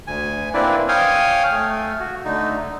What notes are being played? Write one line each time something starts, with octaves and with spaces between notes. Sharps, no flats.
D2 G#5
A#3 C4 D4 E4 B4 D5
C#5 F5 G5 G#5 D#6 F6
A3
F#4
D3 A3 D#4